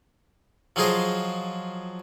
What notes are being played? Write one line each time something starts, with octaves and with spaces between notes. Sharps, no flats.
F3 F#3 F4 G#4 C5 D#5